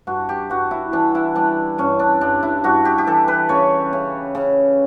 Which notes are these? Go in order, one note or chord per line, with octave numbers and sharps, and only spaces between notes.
G2 F#4
G4
G2 F#4
E4
E3 D4
E4
G3 D4
G2 C#4
D4
G2 D4
E4
G2 F#4
G4
G4
E3 A4
B4
C#3 C#5
C#3
C#3